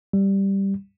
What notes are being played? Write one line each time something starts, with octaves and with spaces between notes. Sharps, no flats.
G3